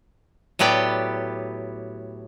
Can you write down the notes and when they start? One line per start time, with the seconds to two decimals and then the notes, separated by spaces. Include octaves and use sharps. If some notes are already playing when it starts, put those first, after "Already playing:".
0.59 A2 F#3 B3 G4 D5 G5